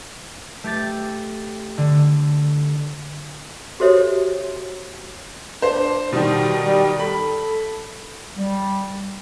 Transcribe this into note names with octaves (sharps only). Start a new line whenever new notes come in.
A3 G4 A6
D3
F#4 G4 A4 C5 C#5 E5
D4 C5
B2 D#3 G3
G3
A4 B5
G3